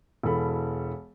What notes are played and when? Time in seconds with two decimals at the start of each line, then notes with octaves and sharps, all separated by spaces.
0.23 E1 E3 A4 B5